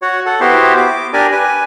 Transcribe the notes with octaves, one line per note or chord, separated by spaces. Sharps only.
F#4 C#5 F#5
A4 F#5
B3 E4 F#4 G4 C5
D6
D4 G4 A#4 D5 G#5
B4 G#5